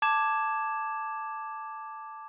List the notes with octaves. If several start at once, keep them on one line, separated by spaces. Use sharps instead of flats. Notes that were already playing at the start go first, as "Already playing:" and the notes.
A5 D6 G#6 E7